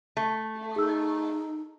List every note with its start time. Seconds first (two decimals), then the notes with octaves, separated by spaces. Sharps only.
0.17 A3
0.76 D#4 G#4 E6